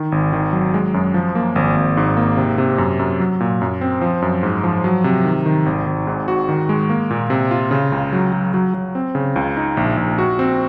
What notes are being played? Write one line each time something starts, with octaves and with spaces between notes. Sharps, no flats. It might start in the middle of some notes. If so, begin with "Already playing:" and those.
Already playing: D#3
G#1
D#3
F#3
G#3
F#2
F3
A#3
G#1
G#1
G#2
A#3
C3
C3
F#2
F#2
F#3
A#2
F#2
C4
F3
F#2
G#2
F3
F#3
C3
D#3
D#3
G#1
G#1
G#2
F#4
D#3
G#3
A#3
A#2
C3
F4
C#3
C#2
F#3
F#3
F#3
F#3
C4
C#3
C#2
D#4
A#1
A#1
F#4
C4